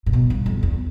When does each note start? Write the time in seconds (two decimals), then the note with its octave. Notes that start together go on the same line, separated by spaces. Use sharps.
0.06 A2
0.13 B2
0.30 G2
0.46 F2
0.63 E2